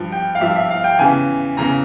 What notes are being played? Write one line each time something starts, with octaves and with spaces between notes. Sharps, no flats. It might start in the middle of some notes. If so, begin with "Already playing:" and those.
Already playing: G2 F3
G5
F5
G2 F3 E5
E5
F5
G5
E2 C#3 E3 G#5
E2 C#3 E3 A#5